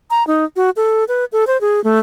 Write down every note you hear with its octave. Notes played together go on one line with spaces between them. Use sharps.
A#5
D#4
F#4
A4
B4
A4
C5
G#4
A3